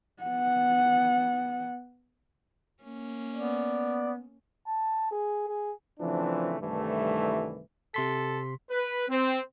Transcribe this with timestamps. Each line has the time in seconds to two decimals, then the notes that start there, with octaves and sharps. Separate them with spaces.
0.23 B3 F#5
2.83 A#3 C#4
3.36 B3 D5
4.67 A5
5.11 G#4
5.48 G#4
6.00 C#3 E3 F3 A3 C4 D4
6.61 C2 G2 D#3 E3 A3
7.94 C3 A4 C6 B6
8.70 B4
9.09 C4